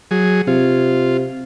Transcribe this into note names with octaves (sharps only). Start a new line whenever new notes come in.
F#3 G#4
C3 F4